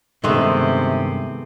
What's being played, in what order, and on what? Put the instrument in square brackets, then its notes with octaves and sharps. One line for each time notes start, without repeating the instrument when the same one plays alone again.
[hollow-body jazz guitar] G2 D#3 C6 [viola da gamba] C3 [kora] G#3 A3 B3